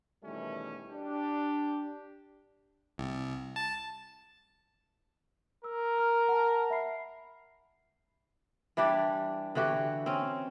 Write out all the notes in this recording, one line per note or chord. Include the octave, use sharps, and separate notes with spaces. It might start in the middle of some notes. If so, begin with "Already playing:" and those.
B2 D#3 E3 G3 A3 C#4
D4 G4
C2
A5
A#4 E6
A#5 F6
F#5 A5
E5 B5 C7
E3 G3 D4 G4
D3 E3 F#4 G4
C4 C#4